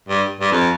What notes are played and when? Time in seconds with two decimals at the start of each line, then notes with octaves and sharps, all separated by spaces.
0.09 G2
0.41 G2
0.52 F2